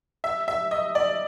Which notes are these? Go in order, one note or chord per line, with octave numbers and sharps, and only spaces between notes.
E5
E5
D#5
D5